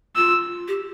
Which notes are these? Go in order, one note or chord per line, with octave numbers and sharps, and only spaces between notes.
F4 E6
G4